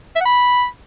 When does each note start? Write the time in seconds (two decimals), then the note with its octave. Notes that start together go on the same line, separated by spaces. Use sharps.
0.15 E5
0.20 F#5
0.26 B5